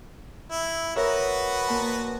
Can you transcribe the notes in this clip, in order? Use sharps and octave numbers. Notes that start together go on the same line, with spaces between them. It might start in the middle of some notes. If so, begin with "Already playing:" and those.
E4
B3 F#4 A#4 B4 C#5 E5
A#2 A#3 A5